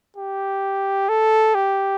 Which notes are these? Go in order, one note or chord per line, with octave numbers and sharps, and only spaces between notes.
G4
A4
G4